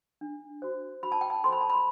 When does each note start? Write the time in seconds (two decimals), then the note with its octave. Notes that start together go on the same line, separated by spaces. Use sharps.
0.21 D4
0.62 F#4 C5
1.03 F#4 B5
1.12 A5
1.21 G5
1.30 A5
1.44 A4 C5 C6
1.52 B5
1.61 A5
1.70 B5